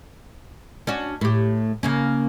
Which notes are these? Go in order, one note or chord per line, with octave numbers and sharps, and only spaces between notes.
C#4 D4 F#4
A2 G4
C#3 A#3 C#4